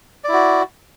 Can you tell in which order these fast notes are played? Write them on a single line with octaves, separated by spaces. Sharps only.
D5 E4 F#4